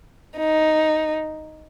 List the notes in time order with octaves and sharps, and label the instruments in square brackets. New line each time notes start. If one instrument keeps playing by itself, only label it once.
[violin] D#4